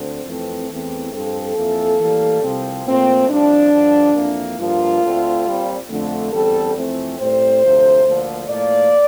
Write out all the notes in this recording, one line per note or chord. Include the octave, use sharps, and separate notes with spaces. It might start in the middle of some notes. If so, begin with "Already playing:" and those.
Already playing: D2 D3 C4
F2 E3 A3 C4
E2 E3 A3 C4
G2 F3 C4 A4
F2 E3 A#3
A2 E3 G3 A#3
C2 C3 F3 C4
A#2 F3 A3 C4
C2 C3 F3 D4
G2 D3 F3
F2 E3 A#3
G2 D3 F3 A#3 F4
D2 D3 A3 C4
A#2 G3 C4
F2 D3 A3
E2 D3 G3 C4 A4
F2 E3 A3 C4
A2 G3 C4 C5
D2 C3 F3
D2 D3 F3 A#3
A2 F3 A#3 D5